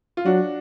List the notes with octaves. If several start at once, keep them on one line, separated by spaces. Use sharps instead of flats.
F4
F#3 D4 F#4